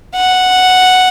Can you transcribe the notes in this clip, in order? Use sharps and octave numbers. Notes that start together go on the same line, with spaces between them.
F#5